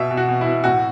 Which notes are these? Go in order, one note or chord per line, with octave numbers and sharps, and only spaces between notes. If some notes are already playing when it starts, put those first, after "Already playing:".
Already playing: B2 E5
B2
F#4
B2
E4
B2
A2 F#4